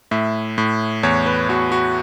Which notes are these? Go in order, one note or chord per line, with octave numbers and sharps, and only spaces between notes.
A2 E5
A2
E2 C#5
B4
E2 F#4
F#4